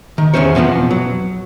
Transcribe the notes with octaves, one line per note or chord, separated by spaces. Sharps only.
D#3
E2 C#3 C#4 C5 C#5
F2 B2 F3 B3
F#3